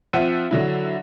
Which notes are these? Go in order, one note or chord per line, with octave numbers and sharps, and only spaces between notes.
F3 C4 C5 E5 F#5 D#7
D3 F#3 E4